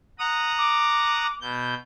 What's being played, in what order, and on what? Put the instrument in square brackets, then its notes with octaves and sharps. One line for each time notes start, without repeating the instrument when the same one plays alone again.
[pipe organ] F#5 A#5 D#6
[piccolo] D6
[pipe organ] B2 G6